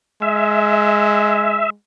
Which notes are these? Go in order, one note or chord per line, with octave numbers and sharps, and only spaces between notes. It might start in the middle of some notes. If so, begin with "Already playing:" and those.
G#3 E5